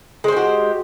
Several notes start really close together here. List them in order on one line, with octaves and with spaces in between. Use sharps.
G#3 C5 G4 F#4